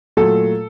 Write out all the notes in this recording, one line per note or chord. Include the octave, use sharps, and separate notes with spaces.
A#2 F#3 A3 A4